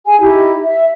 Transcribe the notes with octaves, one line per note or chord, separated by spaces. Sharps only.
G#4 G#5
D#4 E4 G4
E5